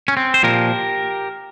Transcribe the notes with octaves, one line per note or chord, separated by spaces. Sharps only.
C#4
C4
C5
A#2 F3 G4 A#4